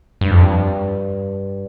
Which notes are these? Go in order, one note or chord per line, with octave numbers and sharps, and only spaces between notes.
G2
F2
G2